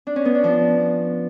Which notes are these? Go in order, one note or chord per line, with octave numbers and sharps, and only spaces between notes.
D4
C#4
B3
D4
F3